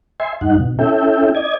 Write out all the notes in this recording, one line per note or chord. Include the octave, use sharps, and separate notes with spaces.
E5 G#5 C6
G2 D#4 F#5
B2
C#4 E4 A4 E5 G5
D5 D#5 G#6